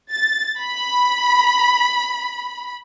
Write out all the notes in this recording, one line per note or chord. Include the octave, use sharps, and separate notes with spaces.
A6
B5